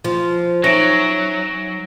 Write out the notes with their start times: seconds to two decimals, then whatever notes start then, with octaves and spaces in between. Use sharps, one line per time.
0.04 F3
0.64 F#3 C#4 D#4 E5 A#6 D7